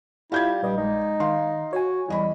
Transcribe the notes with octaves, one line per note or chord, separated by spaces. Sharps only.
G3 E4 F4 F5 G6 G#6
A#1 G2 G3 D5 D#5
G#3 D#4
D#3 F5 C6
F#4 C#5 G#5
E2 G3 D#5 B5